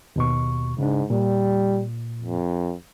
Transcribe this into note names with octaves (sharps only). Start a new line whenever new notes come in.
D#2 B2 C#6
G#2 C#3 D4
A#2 G3
F2